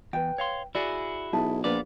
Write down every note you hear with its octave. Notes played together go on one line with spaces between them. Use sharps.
E2 B4 G5
C#5 F5 C6
E4 F#4 G#4 D5
B1 E4 G#4 A5
A#1 B3 F4 B4 D5